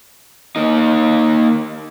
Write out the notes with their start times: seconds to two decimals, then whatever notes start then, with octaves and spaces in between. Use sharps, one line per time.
0.56 A#3 D#4